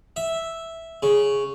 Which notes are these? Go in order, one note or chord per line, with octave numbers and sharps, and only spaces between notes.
E5
C#3